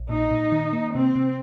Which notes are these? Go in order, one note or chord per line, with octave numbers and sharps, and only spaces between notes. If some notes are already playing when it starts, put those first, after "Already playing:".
Already playing: A#1
A#2 D#4
A#2
D#3
A#3
C3 C4
C3